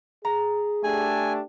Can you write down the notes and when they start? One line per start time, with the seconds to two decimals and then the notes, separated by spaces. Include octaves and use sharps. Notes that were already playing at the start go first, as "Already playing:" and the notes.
0.25 G#4 A#5
0.84 A3 D4 G4 G#5